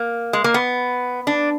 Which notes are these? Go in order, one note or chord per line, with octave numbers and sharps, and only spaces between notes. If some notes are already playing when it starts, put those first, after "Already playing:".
Already playing: A#3
G#3
A#3
B3
D4